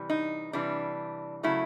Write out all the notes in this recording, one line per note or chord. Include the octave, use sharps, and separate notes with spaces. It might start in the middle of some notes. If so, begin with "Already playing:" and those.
Already playing: C3 E3 G3
D#4
C3 E3 G3 D4
C#3 F#3 A3 E4